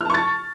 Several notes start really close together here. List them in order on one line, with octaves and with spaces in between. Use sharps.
F6 A5 C#6 A6